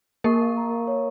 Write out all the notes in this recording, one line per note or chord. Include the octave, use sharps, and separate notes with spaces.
A#3 A#4 C#6
F5
A#5
F5
C#5